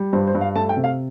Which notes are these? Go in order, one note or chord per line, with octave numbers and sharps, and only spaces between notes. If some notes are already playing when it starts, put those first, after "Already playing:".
Already playing: G3
G2 C5
C5
G2
F5
A3 A5
G5
C3
F5